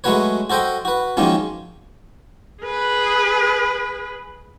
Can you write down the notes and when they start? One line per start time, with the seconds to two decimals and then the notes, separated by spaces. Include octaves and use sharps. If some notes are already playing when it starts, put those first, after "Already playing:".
0.04 F#3 G#3 A3 F#4 B4 C#5
0.50 F#4 A4 C5 D#5 G5
0.85 F#4 B4
1.17 D#3 F3 F#3 G#3 A#3 C#4
2.62 G#4 B4